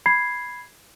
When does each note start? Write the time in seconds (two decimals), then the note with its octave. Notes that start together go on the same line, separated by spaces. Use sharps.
0.06 B5 G#6 C7